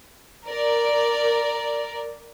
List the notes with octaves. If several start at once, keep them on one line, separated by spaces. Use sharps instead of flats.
A#4 D5